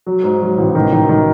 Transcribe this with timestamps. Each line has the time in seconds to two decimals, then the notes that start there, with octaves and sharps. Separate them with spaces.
0.06 F#3
0.24 G#2
0.41 F#3
0.58 A1
0.75 D#3
0.92 D#3
1.09 D#3